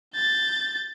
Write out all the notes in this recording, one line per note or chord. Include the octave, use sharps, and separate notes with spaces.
G6 A6